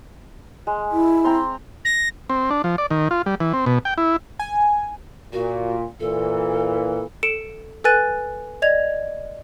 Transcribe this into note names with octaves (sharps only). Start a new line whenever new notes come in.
G#3
E4
C4 A#5 C6
A#6
C4
D4
F3
D5
D#3
F4
G3
E3
C4
B2
G5
E4
G#5
A#2 F#4
A#2 E3 A4
A4 C#7 D7 E7
A4 B4 G#5 F#6 A6 D#7
D5 D#5 G#6 F7